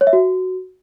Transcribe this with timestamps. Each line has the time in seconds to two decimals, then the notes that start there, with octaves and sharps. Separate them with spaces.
0.01 C#5
0.07 E5
0.13 F#4